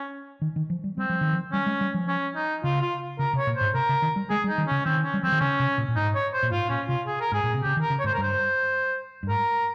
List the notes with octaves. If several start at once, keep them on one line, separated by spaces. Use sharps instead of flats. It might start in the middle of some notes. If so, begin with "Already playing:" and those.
Already playing: C#4
D#3
D#3
F3
G3
G3 C4
F3
D#3
F3
G3 C#4
G#3
G3
F3
C#4
D#4
C#3 F4
F4
C#3 A#4
C3
C#5
A#2
G#2 C5
C3 A#4
C#3
D#3
G3
G#3 G#4
G3
D#4
D#3
C#3 C#4
D#3 C4
C#4
G3
F3 C4
D#3
C#3 C#4
C3
A#2
A#2
G#2 D#4
C#5
C5
A#2
G#2 F4
A#2 C#4
C3 F4
G#4
A#4
G#2 G#4
A#2
C3
C#3 G4
D#3
A#4
C#3
C#5
G#2
C5
A#4
G2 C5
G2
G#2 A#4